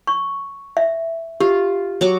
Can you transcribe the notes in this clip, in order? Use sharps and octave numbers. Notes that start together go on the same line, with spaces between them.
C#6
E5
F4 G4
F#3 C#6 D6